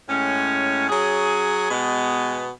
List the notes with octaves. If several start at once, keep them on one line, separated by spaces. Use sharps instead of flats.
A2 G#3 C#4
F#3 C#4 G#4
B2 G#3 B3